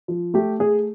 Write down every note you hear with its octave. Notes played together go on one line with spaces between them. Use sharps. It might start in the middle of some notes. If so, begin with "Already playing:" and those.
F3
A3 G4
A3 G#4